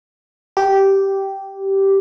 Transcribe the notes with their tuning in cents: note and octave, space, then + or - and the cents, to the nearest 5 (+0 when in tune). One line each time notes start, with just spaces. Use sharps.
G4 -10